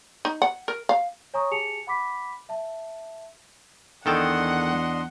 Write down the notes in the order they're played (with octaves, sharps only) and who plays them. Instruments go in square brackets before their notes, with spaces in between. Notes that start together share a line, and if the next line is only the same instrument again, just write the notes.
[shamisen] D#4
F#5
A#4
F5
[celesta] C#5 G#5 A#5 C#6 D#6
G4 G#4 G#5 A5 C#7 F7
F#5 B5 D6 B6
E5 A5
[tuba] E2 [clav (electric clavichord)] D#3 A4 G5 [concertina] D4 D#5 C6 [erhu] F#5